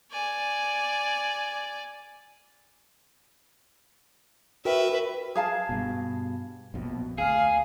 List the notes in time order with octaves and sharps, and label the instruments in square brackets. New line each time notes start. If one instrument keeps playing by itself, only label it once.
[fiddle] D5 G#5
[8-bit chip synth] F#4 A#4 G5 [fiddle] B4 E5
[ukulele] G#4 F5 A5
[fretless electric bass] G2 B2
A#1 F2 B2
[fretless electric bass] D2 [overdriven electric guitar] G#4 [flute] F5